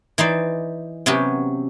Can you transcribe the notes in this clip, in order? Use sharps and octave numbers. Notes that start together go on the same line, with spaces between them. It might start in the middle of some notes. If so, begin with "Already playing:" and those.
E3 D#4 C5 D5
C3 F#3 B3 C#4 F#4 G4